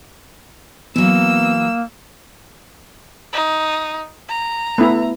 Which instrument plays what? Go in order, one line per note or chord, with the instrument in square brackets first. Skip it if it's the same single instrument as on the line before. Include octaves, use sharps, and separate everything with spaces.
[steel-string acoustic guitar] E3 F#3 [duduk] A#3 [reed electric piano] B3 [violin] E6
[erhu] D#4
A#5
[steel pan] A3 B3 E4